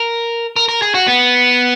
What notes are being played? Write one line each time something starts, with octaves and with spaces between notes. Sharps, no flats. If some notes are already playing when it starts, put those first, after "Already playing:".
Already playing: A#4
A#4
A#4
G#4
F#4
B3